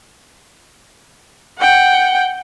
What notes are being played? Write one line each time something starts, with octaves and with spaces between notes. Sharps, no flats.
F#5 G5